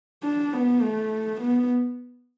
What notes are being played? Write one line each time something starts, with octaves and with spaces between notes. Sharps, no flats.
D4
B3
A3
B3